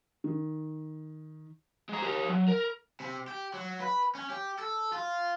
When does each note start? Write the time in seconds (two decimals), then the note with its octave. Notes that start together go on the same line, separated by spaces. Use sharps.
0.24 D#3
1.89 G#3 A#5
2.03 G4 A#4
2.30 F#3
2.49 A#4
3.00 C3
3.28 G4
3.54 F#3
3.80 B4
4.15 C#4
4.30 G4
4.58 A4
4.93 F4